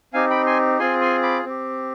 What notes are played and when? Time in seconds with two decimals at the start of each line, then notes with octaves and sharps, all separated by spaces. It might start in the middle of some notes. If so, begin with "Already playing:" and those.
0.14 C4 D#4 G4 F5 G#5
0.30 G5 B5
0.46 G#5 C6
0.79 C4 F4 G#4 G#5 C6
1.01 G#5 C6
1.23 B5 D6
1.45 C4 G4